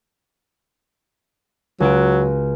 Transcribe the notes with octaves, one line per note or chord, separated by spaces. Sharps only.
C#2 F#3 F#4 D7